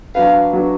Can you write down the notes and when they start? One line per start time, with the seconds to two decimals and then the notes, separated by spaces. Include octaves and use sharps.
0.15 F#3 D4 F#4 B4 F5
0.53 F#3 D4 F#4 B4